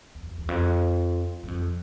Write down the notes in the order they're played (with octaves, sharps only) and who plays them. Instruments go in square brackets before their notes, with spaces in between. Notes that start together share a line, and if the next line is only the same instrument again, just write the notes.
[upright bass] E2
E2
E2
F2
F#2
F2